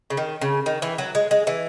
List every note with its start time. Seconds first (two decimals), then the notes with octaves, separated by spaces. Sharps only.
0.10 C#3
0.17 D#3
0.41 C#3
0.66 D#3
0.82 E3
0.98 F#3
1.15 G#3
1.31 G#3
1.47 E3